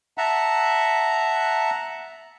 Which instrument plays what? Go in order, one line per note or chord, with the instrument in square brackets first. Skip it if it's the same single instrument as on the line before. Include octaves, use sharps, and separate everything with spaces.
[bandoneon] E5 F#5 A5 A#5